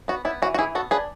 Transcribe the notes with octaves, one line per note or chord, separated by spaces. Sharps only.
B3 F#4
B3 E4
E3 F#4
F#4
E3 E4 G#4
B3 F#4 A4
D4 G#4 B4